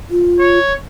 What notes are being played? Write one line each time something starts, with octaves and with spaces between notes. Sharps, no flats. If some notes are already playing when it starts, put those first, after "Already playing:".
F4
C#5